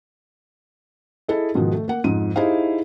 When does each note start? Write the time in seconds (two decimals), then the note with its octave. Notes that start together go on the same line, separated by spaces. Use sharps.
1.28 E4 G#4 A4 D#5
1.55 G#2 B2 D#3 F3
1.73 A3
1.88 A#3 F#5
2.04 F2 G#2 D#7
2.36 D#4 E4 G4 G#4 C5 F5